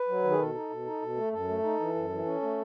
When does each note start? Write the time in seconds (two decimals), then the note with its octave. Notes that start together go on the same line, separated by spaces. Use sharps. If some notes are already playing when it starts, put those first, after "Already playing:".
Already playing: B4
0.08 F#3
0.24 D#3
0.31 G#4
0.39 B2 A4
0.55 D#4
0.70 B2
0.86 D#4
1.02 B2
1.17 A3
1.32 F#2 A4
1.49 A3
1.63 D#4
1.80 E3
1.95 F#2
2.10 E3
2.25 C#4
2.42 A3